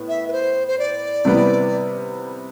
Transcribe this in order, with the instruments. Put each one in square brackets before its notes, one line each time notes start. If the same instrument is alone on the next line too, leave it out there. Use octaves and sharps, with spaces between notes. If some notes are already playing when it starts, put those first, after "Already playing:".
Already playing: [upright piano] A2 B3
[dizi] E5
B4
C5
C5
D5
[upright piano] C3 G3 B3 E4